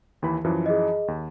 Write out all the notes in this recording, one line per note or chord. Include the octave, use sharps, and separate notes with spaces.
D#2 E3 B5
F#2 E3 F3
G#4 D#5
D#2